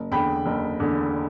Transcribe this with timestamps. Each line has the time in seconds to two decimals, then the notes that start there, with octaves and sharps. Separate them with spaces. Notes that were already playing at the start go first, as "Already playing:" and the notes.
Already playing: F#1
0.11 E2 D3 G5 B5
0.46 F#1
0.80 E2 D3